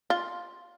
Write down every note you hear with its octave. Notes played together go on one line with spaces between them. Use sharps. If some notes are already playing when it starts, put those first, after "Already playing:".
F4